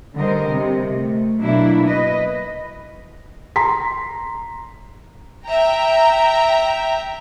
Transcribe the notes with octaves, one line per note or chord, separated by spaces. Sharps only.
D3 G3 A#4 C5 D#5
C3
A3
B2 F#3 A#3 D4 E4
B4 D#5
A#5 C6 B6
E5 G5 A#5